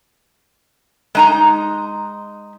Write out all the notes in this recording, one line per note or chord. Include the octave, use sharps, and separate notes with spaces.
G#3 D#4 A#5